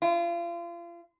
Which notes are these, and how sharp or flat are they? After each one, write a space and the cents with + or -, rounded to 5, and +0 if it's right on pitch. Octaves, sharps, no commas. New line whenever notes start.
F4 -35